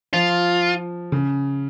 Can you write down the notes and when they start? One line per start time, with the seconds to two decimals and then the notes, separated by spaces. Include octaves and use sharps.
0.13 F3 F4
1.12 C#3